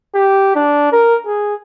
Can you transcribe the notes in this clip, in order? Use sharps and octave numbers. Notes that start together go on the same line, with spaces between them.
G4
D4
A#4
G#4